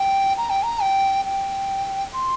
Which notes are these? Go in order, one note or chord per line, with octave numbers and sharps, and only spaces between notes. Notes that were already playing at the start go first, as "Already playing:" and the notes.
Already playing: G5
A#5
G5
A#5
G5
G5
C6